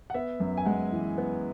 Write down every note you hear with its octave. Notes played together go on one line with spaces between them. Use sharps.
F#5
B3 E5
F#2
G#5
G#3 F#5
E3
B3